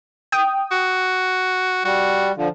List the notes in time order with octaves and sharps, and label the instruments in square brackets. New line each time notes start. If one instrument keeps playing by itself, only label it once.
[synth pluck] G5 D#6
[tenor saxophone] F#4
[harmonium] G3 [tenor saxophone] F#4
[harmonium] D3 F3